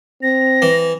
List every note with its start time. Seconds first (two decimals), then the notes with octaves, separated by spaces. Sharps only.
0.23 C4 A#6
0.62 E3